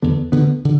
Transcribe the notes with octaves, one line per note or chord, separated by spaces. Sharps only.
E2 D3 B3
D2 D3 B3
D3